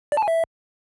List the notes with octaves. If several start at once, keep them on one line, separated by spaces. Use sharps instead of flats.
D5
A5
G#5
E5